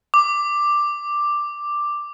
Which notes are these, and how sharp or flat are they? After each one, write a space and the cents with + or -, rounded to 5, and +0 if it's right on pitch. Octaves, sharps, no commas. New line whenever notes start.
D6 +5